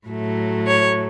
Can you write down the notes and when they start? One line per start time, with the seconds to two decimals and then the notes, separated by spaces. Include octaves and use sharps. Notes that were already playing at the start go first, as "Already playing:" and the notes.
0.08 A2 F#3 A3
0.67 C#5